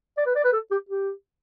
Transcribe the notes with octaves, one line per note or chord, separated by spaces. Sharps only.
D5
B4
D5
B4
A4
G4
G4